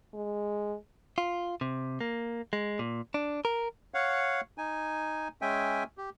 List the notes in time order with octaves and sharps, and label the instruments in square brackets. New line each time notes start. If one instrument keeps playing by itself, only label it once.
[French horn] G#3
[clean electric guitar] F4
C3
A#3
G#3
A#2
D4
A#4
[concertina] C#5 F5 F#5
D#4 G#5
G#3 C#4 E5 G5 G#5
G4